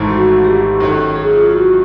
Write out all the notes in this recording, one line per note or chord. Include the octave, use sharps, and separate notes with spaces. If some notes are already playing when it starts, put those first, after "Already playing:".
Already playing: G#1 G#2 E3 A3
F#4
G4
F#2 D#3 F#3 A4
G#4
F4
F#4